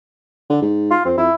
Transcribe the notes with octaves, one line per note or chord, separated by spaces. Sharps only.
D3
G#2
F4
F2 C4
F2 E4